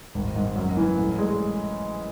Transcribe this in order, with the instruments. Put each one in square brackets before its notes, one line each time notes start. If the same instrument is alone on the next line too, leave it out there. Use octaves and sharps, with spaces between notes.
[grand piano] G#1
G#2
F#2
E3
A2
G#3